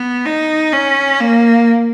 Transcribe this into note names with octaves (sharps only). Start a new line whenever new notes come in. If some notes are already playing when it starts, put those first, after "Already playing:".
Already playing: B3
D#4
C#4
A#3